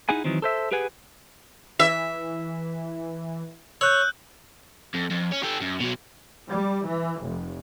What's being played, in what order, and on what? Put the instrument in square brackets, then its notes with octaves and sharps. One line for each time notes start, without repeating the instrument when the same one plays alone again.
[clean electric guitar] D#4 E4 G#4 F#5 G#5
D#3 E3 F#3 C4
A4 C5 E5
G4 G#4 B4 F#5 G#5
[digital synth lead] E3 [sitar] E5
[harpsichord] C#5 [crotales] E6 F#6 G6
[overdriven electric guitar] F2
F2
C#4
G4 A4
F#2
B2 F#3
[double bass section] G3
E3
F1